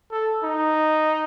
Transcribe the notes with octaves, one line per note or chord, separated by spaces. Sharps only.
A4
D#4